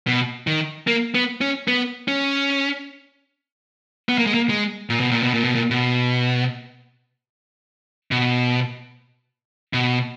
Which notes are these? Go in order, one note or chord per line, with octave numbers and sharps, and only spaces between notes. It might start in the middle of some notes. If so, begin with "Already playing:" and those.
B2
D#3
A#3
B3
C#4
B3
C#4
B3
A#3
G#3
A#3
G#3
A#2
B2
A#2
B2
A#2
B2
A#2
B2
B2
B2